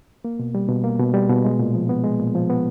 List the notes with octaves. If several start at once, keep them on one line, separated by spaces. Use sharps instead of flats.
A#3
B2
G3
B2
A#3
B2
G3
B2
G#3
A#2
F3
B3
G#3
A#2
F3
B3